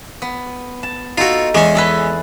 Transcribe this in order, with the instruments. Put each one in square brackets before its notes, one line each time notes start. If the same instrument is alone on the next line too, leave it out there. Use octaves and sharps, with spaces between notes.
[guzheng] B3
A5
[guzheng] D#4 A4 [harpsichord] F4 F#4
[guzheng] E2 [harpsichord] G#3 C#4
[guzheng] G#4 A4 B4